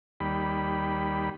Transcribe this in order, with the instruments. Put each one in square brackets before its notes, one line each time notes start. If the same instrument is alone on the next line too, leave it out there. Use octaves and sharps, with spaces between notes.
[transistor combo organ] D#2 G3 B5